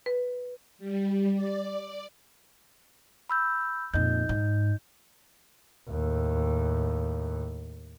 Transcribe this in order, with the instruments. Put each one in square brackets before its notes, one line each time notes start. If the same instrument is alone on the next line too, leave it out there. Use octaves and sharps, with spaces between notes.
[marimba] B4
[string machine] G3
D5
[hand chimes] B5 E6 G6
[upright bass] F2 A#2 [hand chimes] D#4 D#5 G6
[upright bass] G#2
[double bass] D#2 A2